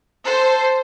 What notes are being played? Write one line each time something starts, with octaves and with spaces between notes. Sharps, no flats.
A4 C5